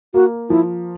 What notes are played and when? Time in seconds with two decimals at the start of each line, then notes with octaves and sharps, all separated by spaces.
0.14 A#3 F#4
0.50 F3 E4